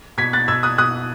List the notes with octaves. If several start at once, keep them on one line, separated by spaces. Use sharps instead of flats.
B2 G#6 B6
F#6 A6
B2 E6 G#6
D#6 F#6
B2 D#6 F#6